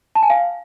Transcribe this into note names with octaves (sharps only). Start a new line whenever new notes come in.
A5
G#5
F5